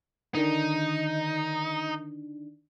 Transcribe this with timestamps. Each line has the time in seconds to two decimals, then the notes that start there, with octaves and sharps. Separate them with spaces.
0.35 D3 D#3 D4 D#4